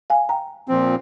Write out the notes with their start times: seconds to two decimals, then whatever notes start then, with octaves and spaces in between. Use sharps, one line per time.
0.10 F5 G#5
0.29 G5 A#5
0.68 A#2 F3 C4